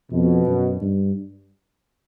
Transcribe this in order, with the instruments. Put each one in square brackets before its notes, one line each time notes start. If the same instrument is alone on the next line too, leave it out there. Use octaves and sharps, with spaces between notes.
[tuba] F2 [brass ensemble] B2
[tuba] F#2
G2